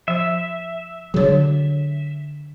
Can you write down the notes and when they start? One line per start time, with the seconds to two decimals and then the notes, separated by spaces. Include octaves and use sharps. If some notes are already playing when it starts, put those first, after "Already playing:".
0.08 F3 E5
1.14 D3 F#3 G#4 C#5